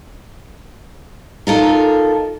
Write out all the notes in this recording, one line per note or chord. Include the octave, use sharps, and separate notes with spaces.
D#4 F4 A4 A#4